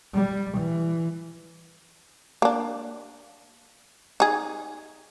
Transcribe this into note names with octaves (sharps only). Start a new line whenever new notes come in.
G3
E3
A#3 D4
D#4 G#4